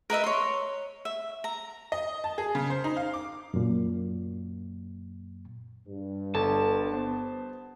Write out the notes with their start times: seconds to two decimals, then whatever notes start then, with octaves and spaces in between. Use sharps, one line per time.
0.10 A#4 B4 D#5 E5
0.24 C#5 C6
1.05 E5
1.44 A#5
1.92 D#5
2.24 A5
2.38 G#4
2.55 C#3
2.70 C5
2.84 D#4
2.97 F5
3.14 D6
3.54 F#2 A#2
5.87 G2
6.35 G1 A4 A5
6.93 B3 C5